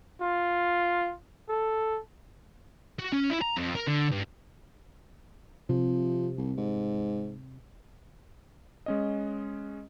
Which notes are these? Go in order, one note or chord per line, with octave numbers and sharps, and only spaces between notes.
F4
A4
F#4
C#4
E4
A#5
F2
A#4
D3
G2
C3 F3
C2
G#2
G#3 C#4 D#5